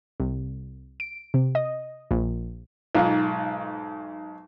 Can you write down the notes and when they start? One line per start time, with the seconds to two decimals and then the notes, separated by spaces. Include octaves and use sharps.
0.20 C2
1.00 D7
1.34 C3
1.55 D#5
2.11 A#1
2.95 B1 G#2 F4